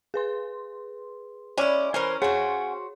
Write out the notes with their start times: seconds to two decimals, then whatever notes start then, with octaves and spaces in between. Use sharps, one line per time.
0.14 G#4 B4 C6
1.58 G#3 C#4 E4 D5
1.94 E3 C#4 A#4 C5 G#5
2.22 F#4 G#4 C5 C#5 F#5 G#5 C6